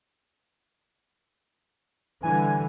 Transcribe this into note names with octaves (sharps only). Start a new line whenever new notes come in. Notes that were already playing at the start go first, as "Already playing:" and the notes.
D3 E3 G3 G#5